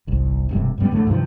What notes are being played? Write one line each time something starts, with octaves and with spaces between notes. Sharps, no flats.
G1 C2
E1 G2 C3
G2 C#3 G3 B3
E2 A2 D3 A3
G2 C3 D#3 F3